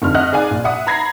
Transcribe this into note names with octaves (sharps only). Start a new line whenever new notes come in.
F1 D3 F6
D#5 E5 F#5 F6 F#6
D#4 G#4 D5 F5 G#5
A#1
E5 F#5 D#6
A#5 B5 G#6 A#6 C7